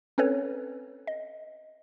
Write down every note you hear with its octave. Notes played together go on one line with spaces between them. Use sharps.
C4 C#4 A4 B4 C#5
D#5